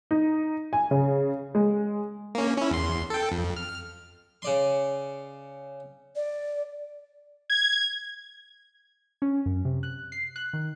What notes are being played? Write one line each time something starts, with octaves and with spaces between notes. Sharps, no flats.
D#4
G#5
C#3
G#3
A#3 C#4
C#4 E4
E2 C6
A4 G5
F2
F6
C#3 D5 C6
D5
G#6
C#4
F#2
C3
F#6
C7
F#6
D#3